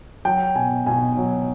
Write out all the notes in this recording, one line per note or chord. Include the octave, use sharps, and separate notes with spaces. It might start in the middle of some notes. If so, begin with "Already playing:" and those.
F#3 G5
B2 G#5
B2 G#5
F#3